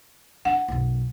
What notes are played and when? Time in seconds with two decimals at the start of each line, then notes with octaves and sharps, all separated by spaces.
0.45 D4 F#5
0.68 B1 F#2